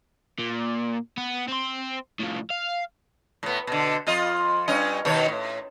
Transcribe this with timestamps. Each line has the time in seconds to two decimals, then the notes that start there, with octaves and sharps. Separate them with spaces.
0.39 A#2
1.18 B3
1.48 C4 C6
2.20 A2 F3
2.50 F5
3.43 A2 B3
3.67 B2 D3
4.07 F2 F4 D#5
4.68 G2 C#4 D#5
5.05 B2 D#3 C#5
5.28 A2